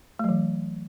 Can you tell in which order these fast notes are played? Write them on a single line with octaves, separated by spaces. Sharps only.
A3 F#3 E3